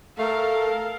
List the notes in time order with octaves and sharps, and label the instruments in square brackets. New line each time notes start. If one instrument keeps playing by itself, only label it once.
[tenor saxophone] A3 [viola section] A4 A#4 F5